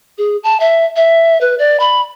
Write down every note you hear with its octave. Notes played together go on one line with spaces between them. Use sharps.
G#4
A5
E5
E5
B4
D5
B5